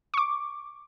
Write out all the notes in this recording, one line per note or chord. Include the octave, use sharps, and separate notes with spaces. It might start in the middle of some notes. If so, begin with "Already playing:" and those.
C#6 D6